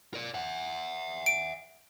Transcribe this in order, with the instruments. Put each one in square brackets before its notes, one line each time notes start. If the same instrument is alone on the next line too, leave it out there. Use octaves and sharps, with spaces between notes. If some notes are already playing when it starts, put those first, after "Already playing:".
[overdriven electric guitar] A#4 D5
E5 F#5
[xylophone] D7